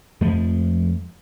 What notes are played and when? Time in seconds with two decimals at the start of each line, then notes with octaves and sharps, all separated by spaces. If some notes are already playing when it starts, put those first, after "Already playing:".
0.21 F2 F3 G#3 A3